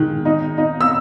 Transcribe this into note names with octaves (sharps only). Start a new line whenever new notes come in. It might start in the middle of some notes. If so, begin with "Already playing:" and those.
Already playing: D#3 G#3 F#6
D#4
D#4
E6